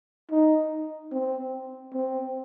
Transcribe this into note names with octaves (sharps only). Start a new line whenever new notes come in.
D#4
C4
C4